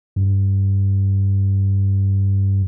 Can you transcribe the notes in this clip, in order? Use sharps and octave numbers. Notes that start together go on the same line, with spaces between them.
G2